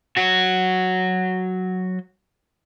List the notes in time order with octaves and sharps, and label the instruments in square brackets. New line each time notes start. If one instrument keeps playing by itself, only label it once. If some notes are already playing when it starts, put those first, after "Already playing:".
[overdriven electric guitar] F#3 F#4